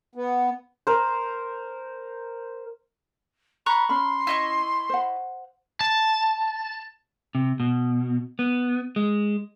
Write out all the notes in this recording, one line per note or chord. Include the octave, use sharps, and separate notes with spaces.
B3
A#4 C5
A#5 B5 C#6 F#6
C#4 B5 C6
E4 D#5 C#6
C5 F#5
A5
C3
B2
B3
G#3